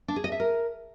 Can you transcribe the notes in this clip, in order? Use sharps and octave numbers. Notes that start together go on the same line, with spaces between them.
D4
G#4
D#5
E5
A#4